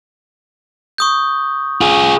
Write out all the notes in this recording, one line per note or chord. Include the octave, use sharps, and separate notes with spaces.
C#6 D#6 G6
F4 G#4